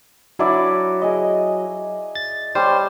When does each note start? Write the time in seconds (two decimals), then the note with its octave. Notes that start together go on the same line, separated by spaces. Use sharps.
0.39 F#3 D4 E4 D5
1.02 G#4 D#5
2.15 A6
2.55 G3 C5 C#5 A5